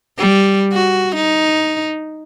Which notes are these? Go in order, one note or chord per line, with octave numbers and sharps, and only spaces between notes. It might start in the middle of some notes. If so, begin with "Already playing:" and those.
G3
F#4
D#4